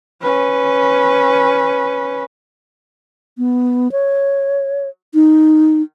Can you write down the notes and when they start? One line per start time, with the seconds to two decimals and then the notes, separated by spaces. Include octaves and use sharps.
0.22 C#4 B4
3.38 B3
3.92 C#5
5.14 D#4